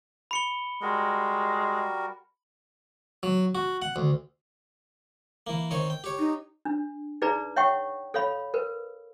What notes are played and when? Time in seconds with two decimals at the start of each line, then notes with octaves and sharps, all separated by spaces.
0.31 B5 C#7 G7
0.82 G3 G#3 F#4 A#4
3.23 F#3
3.55 F#4
3.82 F#5
3.96 D2
5.47 E3 A#3
5.71 D#3 C4 C#5
5.90 G5
6.04 G4 C#5
6.19 D#4
6.65 D4
7.22 D#4 G#4 B4 D5 A#5
7.56 C#5 E5 F#5 G5 C#6
8.14 A4 C#5 F5 B5
8.54 A#4 B4